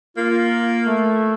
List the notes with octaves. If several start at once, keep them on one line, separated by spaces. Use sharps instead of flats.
A#3 F4
A3